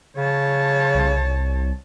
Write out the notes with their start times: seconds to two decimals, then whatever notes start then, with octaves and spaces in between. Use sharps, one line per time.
0.17 C#3 C#5 A5
0.95 C2